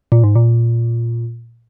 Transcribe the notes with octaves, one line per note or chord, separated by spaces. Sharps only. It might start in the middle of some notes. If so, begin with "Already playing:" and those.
A#2
G#2
A#2